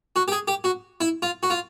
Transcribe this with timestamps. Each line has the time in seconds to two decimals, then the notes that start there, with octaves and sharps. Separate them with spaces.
0.16 F#4
0.28 G4
0.32 G#4
0.48 G4
0.64 F#4
1.01 E4
1.22 F4
1.43 F#4
1.50 F4